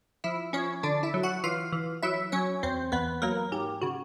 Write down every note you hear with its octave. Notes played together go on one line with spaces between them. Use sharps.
F3 E4 E5
F3 C#4 C#5
D3 D4 D5
E4 E5
F#3
F#4 F#5
E3 F4 F5
E3
F#3 E4 E5
F#3 C#4 C#5
E2 C4 C5
E2 B3 B4
F#3 A#3 A#4
G#2 G4
C#3 F#4